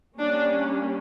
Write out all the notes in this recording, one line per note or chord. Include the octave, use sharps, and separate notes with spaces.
G3 A#3 C#4 D4